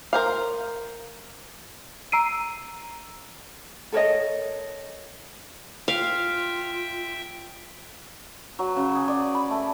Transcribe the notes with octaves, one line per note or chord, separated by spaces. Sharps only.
A#4 C5 F5
A#5 E6 C7 D7 D#7
A4 A#4 C#5 D#5
F4 E5 F5 G5
F#3
C#3
G#4
D5
B5
A3